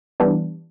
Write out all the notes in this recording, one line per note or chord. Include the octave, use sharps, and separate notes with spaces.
E3 G3 B3 D4